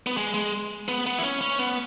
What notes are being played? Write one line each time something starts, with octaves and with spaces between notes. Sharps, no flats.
B3
G#3
G#3
B3
B3
E4
C#4
C#4
B3